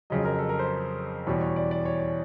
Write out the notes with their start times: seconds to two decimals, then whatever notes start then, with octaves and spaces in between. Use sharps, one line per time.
0.10 F2 C#3 F#3 D#5
0.25 A#4
0.39 A4
0.49 A#4
0.59 C5
1.27 E2 B2 G3 C#5
1.41 C#5
1.56 D5
1.71 D5
1.85 C#5
2.00 C#5